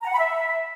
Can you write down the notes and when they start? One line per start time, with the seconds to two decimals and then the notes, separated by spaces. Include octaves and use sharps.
0.03 A#5
0.08 F#5
0.13 B5
0.18 E5